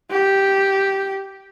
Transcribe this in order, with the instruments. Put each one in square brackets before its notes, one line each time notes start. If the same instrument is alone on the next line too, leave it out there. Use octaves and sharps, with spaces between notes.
[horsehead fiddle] G4